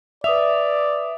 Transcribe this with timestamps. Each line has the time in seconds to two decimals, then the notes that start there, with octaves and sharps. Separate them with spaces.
0.24 B4 D5 E5 D#6 F7